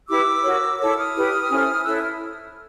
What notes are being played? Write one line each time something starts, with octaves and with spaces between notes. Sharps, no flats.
E4 G4 B4 D6 E6
F#4 A#4 C#5
E4 A4 C#5 D6 E6
D#6 F6
E4 G4 B4
C#4 E4 A4 C5
E4 A4 C#5 E6 F#6
F6